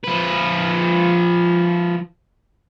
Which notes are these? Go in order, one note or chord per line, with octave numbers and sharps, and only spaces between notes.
F3 B4